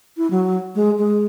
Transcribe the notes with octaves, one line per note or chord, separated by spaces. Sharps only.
E4
F#3
G#3
G#3